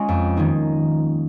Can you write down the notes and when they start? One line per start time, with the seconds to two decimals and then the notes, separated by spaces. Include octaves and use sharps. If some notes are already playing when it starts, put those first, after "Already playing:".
Already playing: G#3 C#4 F4
0.09 F2
0.37 D#3 A#3 D#4